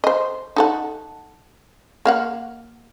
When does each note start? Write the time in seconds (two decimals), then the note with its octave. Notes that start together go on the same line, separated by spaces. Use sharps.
0.04 C5 D#5
0.56 D#4 A4 F#5
2.05 A#3 F5 F#5